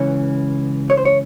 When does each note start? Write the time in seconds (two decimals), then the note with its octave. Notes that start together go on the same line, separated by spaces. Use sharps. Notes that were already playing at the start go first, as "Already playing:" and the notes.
Already playing: C#2 C#3 E3 C#5
0.90 C#5
0.97 C5
1.05 C#5